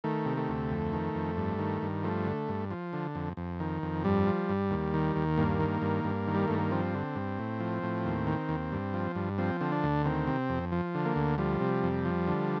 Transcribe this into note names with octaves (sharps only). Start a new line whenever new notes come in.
D#3 A3
C3
A3
D2
F2
D#3
F2
G2
D#3
G2
F3 A3
D3
G2
F3
D3
F2
F2
D#3
F2
G2 G3
F3
G2
D#2
D#3
D#2
G2 A#3
D#3
G2
G2
D#3
G3
G2 A3
A#3
F3 C4
D3
G2
A2
F3
A2
D#2
D#3
D#2
G2
F3
G2
F3 C4
D3 C4
D4
D2
D#3 C4
C3
F2
F3
D3
A#3
D2
F3 G3
C3
F2
F3
D3